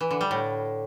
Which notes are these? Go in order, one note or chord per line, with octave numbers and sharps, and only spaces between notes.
E3
D3
G3
A2